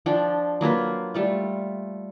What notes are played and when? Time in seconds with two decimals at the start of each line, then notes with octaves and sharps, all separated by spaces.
0.06 F3 D4 G5
0.61 F#3 A#3 F4 B4
1.14 G3 A3 F4